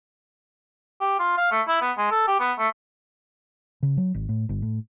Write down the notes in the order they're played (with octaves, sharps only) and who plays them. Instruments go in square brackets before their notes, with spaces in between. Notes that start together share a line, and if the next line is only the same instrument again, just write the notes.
[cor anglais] G4
F4
F5
A3
E4
B3
G#3
A4
G4
B3
A3
[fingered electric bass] C#3
F#3
G#1
A2
G1
A2